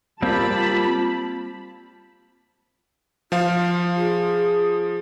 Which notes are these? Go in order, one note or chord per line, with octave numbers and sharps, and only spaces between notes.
G3 A#3 C4 F4 A5 B5
F3 F4 F5
G#4